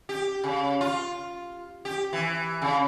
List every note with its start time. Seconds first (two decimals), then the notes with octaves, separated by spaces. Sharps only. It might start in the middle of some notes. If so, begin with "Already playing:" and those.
0.09 G4
0.43 C#3
0.81 F4
1.85 G4
2.13 E3
2.62 C#3